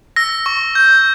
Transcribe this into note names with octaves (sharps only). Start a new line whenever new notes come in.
E6 A#6
C#6
G6